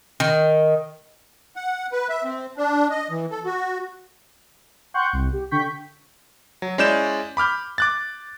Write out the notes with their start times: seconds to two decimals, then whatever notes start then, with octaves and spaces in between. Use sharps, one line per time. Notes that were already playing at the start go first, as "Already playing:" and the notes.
0.20 D#3
1.56 F#5
1.92 B4
2.09 E5
2.24 C4
2.57 D4
2.91 D#5
3.10 E3
3.31 A4
3.45 F#4
4.94 F#5 G5 C6 C#6 F#6 G6
5.13 C2
5.33 G4
5.51 D3 G5 C#6 G6 B6
6.62 F#3
6.78 G#3 C#4 E4 D5 G6 E7
7.37 B5 D6 F6 G6
7.78 D6 F#6 A6